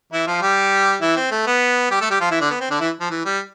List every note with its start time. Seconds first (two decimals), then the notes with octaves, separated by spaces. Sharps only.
0.12 E3 E4
0.27 F3 F4
0.42 G3 G4
1.01 E3 E4
1.16 C4
1.31 A3
1.47 B3
1.91 G3 G4
2.01 A3 A4
2.10 G3 G4
2.21 F3 F4
2.31 E3 E4
2.41 D3 D4
2.50 B3
2.60 C4
2.71 D3 D4
2.80 E3 E4
3.01 F3
3.10 E3
3.25 G3